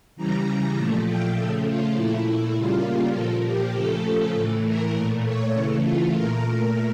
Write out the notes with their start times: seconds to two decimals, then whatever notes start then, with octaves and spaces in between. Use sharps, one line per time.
0.16 C#3 E3 G3 A#5
0.76 A#2 F3 A3 A5
1.06 G5
1.36 C#3 F3 A3 A4
1.66 F4
1.95 A#2 A3 E4
2.55 C#3 G3 A#3 F4
3.15 A#2 F3 A#3 A4
3.45 G4
3.74 C#3 F3 A3 A4
4.34 A2 E3 A3
4.64 A#4
4.94 A#2 A3
5.24 C#5
5.53 C#3 E3 A3 C#5
5.83 F4
6.13 A#2 A3 A#4